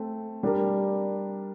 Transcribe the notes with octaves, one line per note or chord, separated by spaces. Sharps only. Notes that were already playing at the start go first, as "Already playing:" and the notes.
Already playing: A3 C4
G3 D4 G4 A#4